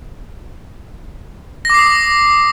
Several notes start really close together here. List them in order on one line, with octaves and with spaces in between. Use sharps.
A#6 D6 C7 D#6